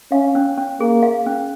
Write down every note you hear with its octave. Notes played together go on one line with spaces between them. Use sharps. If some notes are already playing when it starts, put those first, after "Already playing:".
C#4 F5
C#4
C#4
A#3 G#4
F5
C#4